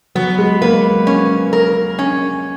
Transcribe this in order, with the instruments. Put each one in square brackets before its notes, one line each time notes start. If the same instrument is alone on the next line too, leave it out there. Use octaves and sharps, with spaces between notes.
[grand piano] F#3 [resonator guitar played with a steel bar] B3
[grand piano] G#3
[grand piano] A#3 [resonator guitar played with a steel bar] B4
[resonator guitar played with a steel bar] C#4
A#4
C#4